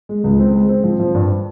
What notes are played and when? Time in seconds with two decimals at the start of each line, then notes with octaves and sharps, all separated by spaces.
0.09 G#3
0.24 C#2
0.39 C4
0.54 G#3
0.69 C4
0.84 F3
0.99 F3
1.14 G2